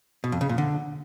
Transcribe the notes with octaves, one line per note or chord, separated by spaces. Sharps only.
B2
F2
C#3
A#2
D3